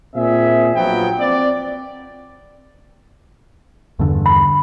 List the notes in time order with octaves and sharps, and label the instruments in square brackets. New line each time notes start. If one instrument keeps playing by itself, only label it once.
[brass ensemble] A#2 C4 G#4 E5
A#1 F3 F#3 B3 G5
C4 D5
[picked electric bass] E2 G2 D3
[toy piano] B5